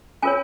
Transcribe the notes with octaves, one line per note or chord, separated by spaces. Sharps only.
C#4 F4 A#4 C#5 G#5